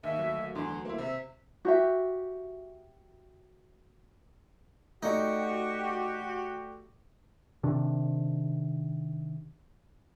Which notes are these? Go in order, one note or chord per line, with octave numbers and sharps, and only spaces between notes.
D#2 E5
D2 F#3
E2 D3 C6
A#3 E4
C3 E5
F#4 G4 E5
A3 D#4 F#4 G4 D5 C#6
C3 D#3 D4